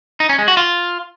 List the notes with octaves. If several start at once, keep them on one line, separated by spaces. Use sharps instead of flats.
D#4
C#4
G#3
F#4
F4